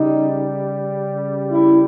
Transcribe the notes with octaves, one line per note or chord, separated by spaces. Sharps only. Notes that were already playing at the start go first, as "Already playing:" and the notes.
Already playing: C#3 G3 D#4
E4